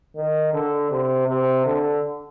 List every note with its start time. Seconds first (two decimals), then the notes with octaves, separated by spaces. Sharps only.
0.16 D#3
0.53 D3
0.91 C3
1.27 C3
1.66 D3